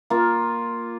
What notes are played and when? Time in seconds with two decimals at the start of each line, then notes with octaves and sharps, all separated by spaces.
0.10 A#3 F4